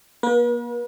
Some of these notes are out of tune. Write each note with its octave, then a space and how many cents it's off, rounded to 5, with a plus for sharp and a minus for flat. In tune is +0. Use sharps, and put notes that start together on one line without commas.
A#3 +35 B4 -45